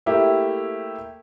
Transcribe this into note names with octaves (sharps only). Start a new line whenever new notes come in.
A3 A#3 E4 G4